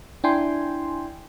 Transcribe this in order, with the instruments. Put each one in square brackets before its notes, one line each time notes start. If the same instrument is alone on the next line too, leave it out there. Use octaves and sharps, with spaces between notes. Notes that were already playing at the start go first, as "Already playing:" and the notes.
[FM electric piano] D4 E4 G5 G#5 C6